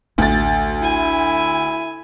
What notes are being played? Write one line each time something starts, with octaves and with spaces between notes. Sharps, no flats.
A1 D2 A3 D4 A6
E4 G#5